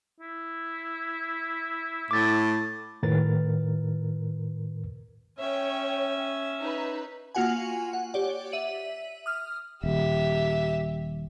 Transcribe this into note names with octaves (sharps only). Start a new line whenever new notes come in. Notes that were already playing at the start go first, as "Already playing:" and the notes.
E4
A2 D6 A6
A2 D#3 A#4 B4 A6
C#4 C#5 E5 G5
D#4 B4
A#3 F4 F#4 F#5 G#5
F#5
G4 C#5 D5 F#5
E5 D#7 F#7
D#6 F6
D#1 G4 E5